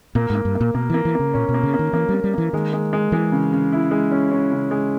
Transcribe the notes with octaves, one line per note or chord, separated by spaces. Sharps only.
A#2 A#3
G#2
A#3
G2
A#3
A#2
B2 A#3
E3 A#3
E3
C#3 A#3
A#2 C#4
B2
A#3
C#3
A#3
D#3
E3 A#3
G3
A#3
G3
E3 A#3
D#3 G#3
G#3
G#3
E3 G#3
C#3
C#3
E4
G#3
C#4
C#4
C#3
G#3